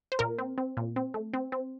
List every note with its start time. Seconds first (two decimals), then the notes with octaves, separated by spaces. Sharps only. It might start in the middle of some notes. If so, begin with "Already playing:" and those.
0.12 C5
0.19 A#2 A#4
0.38 C4
0.58 C4
0.77 A#2
0.96 C4
1.14 A3
1.34 C4
1.52 C4